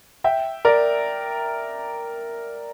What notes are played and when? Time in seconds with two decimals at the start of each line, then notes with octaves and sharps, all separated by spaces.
0.24 E5 G5
0.65 A#4 D5